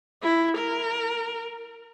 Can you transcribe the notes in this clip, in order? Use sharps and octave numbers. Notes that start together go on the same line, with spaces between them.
E4
A#4